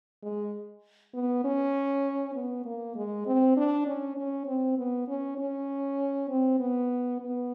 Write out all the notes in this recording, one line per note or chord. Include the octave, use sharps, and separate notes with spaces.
G#3
B3
C#4
B3
A#3
G#3
C4
D4
C#4
C#4
C4
B3
C#4
C#4
C4
B3
B3